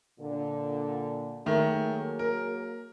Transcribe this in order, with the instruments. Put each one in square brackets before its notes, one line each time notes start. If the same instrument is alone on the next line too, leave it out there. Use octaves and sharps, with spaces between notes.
[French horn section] A#2 D3
[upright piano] D#3 A3 [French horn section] F#3 A#3 G#4
[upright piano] A#4